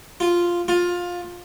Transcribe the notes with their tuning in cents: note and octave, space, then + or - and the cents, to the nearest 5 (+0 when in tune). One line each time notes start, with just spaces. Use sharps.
F4 -5
F4 +15